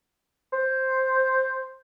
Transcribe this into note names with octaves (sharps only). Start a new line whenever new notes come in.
C5